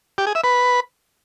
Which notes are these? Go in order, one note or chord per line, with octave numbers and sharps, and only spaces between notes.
G4
G#4
E5
B4